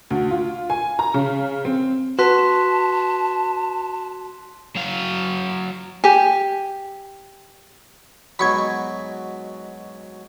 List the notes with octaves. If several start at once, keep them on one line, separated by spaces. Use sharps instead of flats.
D2
F4
G#5
A#5
C#3
C4
F#4 B4 A5 C6 F#6 B6
F#3 F5
G4 G#5
G#2 B2 F#3 B5 C#6 G#6